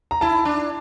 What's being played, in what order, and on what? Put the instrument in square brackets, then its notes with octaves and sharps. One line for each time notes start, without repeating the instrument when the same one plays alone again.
[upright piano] A#5
[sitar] E4 [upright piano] A5
[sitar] D4